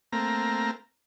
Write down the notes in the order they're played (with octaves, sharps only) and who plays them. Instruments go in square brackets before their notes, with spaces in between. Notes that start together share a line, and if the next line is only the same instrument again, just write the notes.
[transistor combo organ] A3 A#3 C4 A#5